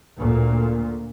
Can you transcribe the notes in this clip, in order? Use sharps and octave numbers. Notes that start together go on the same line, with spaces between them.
D2 A#2